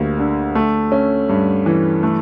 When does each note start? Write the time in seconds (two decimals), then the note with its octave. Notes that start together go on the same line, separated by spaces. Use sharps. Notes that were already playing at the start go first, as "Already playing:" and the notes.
Already playing: D2 G3 A#3
0.19 D3
0.55 A3
0.92 C#4
1.29 G2
1.66 E3
2.03 A3